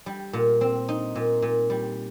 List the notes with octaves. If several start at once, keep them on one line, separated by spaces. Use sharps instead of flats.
G3
A#2
C4
D#4
A#2
A#2
G3